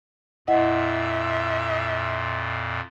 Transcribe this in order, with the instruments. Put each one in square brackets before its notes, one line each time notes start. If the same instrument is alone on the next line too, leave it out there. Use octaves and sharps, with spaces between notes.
[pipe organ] F2 A#2 [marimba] E4 D#5 F#5 [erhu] E5